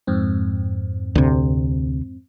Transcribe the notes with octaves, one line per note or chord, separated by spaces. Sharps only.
F2 G#2 C4
D2 C3